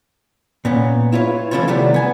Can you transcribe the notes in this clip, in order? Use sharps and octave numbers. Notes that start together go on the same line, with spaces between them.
A#2 B3 C#4
E4 F4 B4 C#5
E3 F3 A3 C#4 E4 F4
C3 D#3 G3 A3 B3 G4
B3 G#5